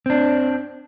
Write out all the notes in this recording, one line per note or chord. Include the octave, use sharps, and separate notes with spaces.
C4 D4